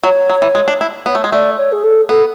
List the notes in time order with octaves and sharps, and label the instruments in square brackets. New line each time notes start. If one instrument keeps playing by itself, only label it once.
[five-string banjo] F#3 [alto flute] C#5
[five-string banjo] F#3
E3
G#3
D4
E4
[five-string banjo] B3 [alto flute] C#5
[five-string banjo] A3
G#3
[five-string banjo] A3 [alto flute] D5
[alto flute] C#5
G#4
A4
[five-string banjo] B3 [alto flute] A4